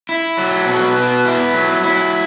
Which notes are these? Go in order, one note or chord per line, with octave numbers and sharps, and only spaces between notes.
E4
F#3
B2
B3
E4
F#3
E4